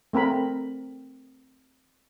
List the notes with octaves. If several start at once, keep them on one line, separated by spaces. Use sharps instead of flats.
A3 C4 A#4 B5